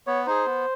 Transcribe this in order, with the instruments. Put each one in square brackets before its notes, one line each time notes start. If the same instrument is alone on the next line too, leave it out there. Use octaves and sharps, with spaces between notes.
[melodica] B3 [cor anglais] C#5
[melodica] D#4 G#4 [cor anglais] C5
[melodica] B3